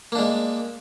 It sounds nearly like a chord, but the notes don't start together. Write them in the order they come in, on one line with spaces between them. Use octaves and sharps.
A#3 D4 G#3